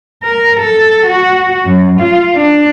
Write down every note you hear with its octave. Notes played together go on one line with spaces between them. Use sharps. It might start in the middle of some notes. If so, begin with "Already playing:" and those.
A#4
A4
F#4
F#2
F4
D4